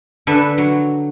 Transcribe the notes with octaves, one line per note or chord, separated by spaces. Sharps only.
D3 D4 A4 B4 E5
F#3